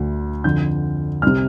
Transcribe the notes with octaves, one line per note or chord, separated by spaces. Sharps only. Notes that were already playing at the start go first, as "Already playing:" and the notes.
Already playing: D2 D3
F2 D3 G6
C2 C3 F6